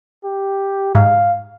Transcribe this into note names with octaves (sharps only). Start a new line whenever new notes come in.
G4
G#2 F5